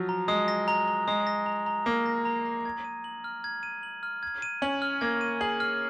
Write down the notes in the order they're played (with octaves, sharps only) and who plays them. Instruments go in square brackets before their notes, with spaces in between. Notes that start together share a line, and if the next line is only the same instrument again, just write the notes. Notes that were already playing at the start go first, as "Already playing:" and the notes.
Already playing: [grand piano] F3 F#3
[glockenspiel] A#5
[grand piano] G#3 [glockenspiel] D#6
[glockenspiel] A#6
A#5
A#5
[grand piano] G#3 [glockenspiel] D#6
[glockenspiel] A#6
A#5
A#5
[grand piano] A#3 [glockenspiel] D#6
[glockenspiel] A#6
A#5
A#5
G#6
D#7
F#7
F6
G#6
D#7
F#7
F6
G#6
D#7
[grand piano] C#4 [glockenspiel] F#7
[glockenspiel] F6
[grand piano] A#3 [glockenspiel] G#6
[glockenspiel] D#7
[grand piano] G#4 [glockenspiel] F#7
[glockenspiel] F6